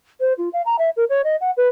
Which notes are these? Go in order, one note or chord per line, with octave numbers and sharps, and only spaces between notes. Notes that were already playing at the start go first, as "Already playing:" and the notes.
C5
F4
F5
A#5
E5
A#4
C#5
D#5
F#5
B4